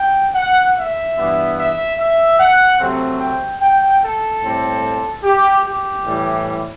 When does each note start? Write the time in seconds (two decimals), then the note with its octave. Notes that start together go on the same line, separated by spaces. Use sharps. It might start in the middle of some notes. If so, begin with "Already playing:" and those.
Already playing: G5
0.35 F#5
0.76 E5
1.17 G2 E3 B3
1.58 E5
1.98 E5
2.39 F#5
2.79 C3 F#3 A3 C4
3.20 G5
3.61 G5
4.02 A4
4.42 A2 G3 C4
5.24 G4
5.64 G4
6.06 A2 E3 G3